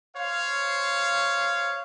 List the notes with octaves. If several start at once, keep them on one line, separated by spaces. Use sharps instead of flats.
C5 C#5 F5